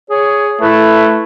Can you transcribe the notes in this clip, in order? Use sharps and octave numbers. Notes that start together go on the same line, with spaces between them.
G#4 C#5
A3 E4 B4